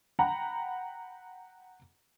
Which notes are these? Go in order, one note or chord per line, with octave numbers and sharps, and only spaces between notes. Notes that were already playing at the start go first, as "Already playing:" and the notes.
F#5 G5 A#5 B5